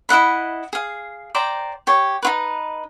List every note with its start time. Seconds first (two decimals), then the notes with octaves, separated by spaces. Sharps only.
0.09 E4 D#5 F#5 B5
0.73 G#4 F5
1.35 C5 D5 G5 A#5
1.87 G4 C#5
2.23 D#4 F4 B4